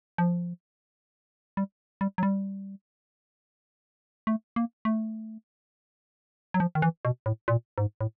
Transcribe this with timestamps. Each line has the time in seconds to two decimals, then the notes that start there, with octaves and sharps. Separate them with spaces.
0.18 F3
1.57 G3
2.01 G3
2.18 F#3
2.23 G3
4.27 A3
4.56 A#3
4.85 A3
6.54 F#3
6.60 F3
6.75 D#3
6.82 E3
7.05 B2
7.26 A2
7.48 A#2
7.78 G#2
8.01 A2